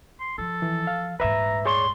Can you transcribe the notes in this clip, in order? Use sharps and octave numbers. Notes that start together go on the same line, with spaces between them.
C6
F3 A4
E3
F5
D#1 G#2 B4 E5 A#5 E6
G#4 C#5 D5 C6 C#6